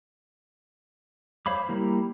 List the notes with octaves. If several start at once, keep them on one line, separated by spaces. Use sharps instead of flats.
C5 C#5 F5 B5 D6
G3 A#3 E4